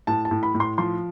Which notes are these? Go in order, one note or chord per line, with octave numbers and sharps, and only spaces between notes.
A2 A5
A5
A2
B5
A2
C6
F3 C6